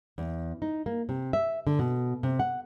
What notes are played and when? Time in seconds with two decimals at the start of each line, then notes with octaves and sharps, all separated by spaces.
0.18 E2
0.62 D#4
0.86 A#3
1.09 C3
1.33 E5
1.67 D3
1.79 B2
2.23 C3
2.39 F#5